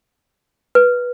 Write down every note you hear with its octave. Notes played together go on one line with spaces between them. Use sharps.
B4